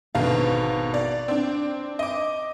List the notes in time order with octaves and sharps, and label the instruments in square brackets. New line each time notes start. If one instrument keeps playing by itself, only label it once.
[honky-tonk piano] G#1 B2 D3 [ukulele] F5
[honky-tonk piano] D5
C4 D4
D#5 D6